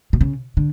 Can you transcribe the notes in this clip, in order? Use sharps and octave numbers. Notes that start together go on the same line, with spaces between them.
B2
C#3
D3